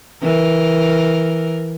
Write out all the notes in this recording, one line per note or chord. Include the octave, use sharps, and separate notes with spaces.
E3 A#4